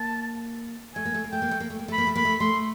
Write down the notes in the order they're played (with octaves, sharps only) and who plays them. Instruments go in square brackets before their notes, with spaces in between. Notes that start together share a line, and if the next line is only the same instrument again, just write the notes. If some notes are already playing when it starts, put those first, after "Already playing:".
Already playing: [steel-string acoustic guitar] A#3 [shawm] A5
[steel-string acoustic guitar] A3 [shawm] G#5
[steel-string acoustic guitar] A#3
A3
A#3
[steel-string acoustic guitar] A3 [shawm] G5
[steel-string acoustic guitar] A#3
A3
A#3
A3
A#3
A3
[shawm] B5
[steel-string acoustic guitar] A#3
A3
[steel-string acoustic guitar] A#3 [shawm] B5
[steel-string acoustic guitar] A3
[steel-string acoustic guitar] A3 [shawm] C6